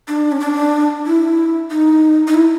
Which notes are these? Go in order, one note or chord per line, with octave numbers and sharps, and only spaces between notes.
D4
C#4
D4
E4
D#4
D#4
E4